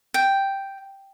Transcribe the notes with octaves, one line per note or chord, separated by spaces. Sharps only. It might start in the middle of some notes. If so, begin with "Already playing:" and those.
G5